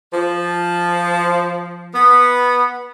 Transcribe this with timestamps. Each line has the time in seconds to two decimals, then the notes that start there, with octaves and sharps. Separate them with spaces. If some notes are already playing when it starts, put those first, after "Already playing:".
0.14 F3
1.94 B3